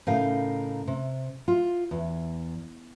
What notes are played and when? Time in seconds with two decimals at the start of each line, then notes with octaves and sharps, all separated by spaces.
0.07 A2 C#3 D#4 A#4 F5
0.87 C3
1.48 F4
1.91 E2